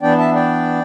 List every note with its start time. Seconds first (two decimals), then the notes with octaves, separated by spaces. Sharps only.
0.02 E3 B3 D4 D5 G5
0.18 E5 A5
0.35 D5 G5